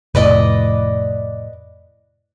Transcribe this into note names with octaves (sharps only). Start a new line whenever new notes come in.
F1 A2 B4 D5 D#5